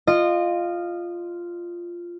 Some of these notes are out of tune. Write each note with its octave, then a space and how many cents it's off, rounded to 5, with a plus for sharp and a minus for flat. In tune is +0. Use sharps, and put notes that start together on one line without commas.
F4 -5 D#5 -25